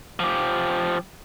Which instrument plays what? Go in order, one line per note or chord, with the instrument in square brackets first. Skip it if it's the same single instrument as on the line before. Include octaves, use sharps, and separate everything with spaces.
[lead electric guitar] F3 G4